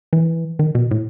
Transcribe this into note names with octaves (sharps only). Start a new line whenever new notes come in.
E3
D#3
B2
A2